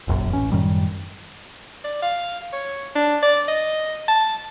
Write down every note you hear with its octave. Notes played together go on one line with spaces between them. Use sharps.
F1 A#1 F#2
A1 C#4
F#2 A2 D#3 G3
D5
F5
C#5
D4
D5
D#5
A5